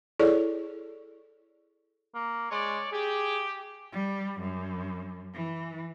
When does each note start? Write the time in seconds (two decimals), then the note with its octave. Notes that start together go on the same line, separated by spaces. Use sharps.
0.19 E4 G#4 A4 C#5 D5
2.15 A#3
2.51 G#3 C#5 D5
2.92 G4 G#4
3.92 G3
4.41 F#2
5.34 E3